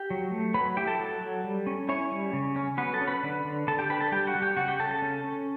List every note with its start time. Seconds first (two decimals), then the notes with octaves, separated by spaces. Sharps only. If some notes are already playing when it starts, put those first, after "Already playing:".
Already playing: G4 G5
0.10 F#3
0.32 A3
0.54 F#3 B4 B5
0.77 E4 G4 G5
0.87 A4 A5
1.00 F#3
1.21 F#3
1.44 G3
1.67 C#4
1.89 C#4 E4 C#5
2.12 G3
2.33 C#3
2.56 C#4
2.77 F#3 B3 B4
2.93 A4 A5
3.01 C#4
3.07 B4 B5
3.23 D3
3.45 D3
3.67 D3 A4 A5
3.78 G4 G5
3.90 D4 B4 B5
4.01 A4 A5
4.12 G3 G4 G5
4.27 F#4 F#5
4.35 G3
4.42 G4 G5
4.57 C#3 F#4 F#5
4.68 G4 G5
4.79 C#3 A4 A5
4.91 A4 A5
5.02 C#4
5.24 C#4